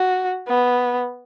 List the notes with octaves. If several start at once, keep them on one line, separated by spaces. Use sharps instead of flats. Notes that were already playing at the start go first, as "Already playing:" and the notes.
Already playing: F#4
B3